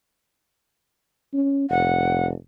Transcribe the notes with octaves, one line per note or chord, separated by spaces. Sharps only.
C#4
F1 F#5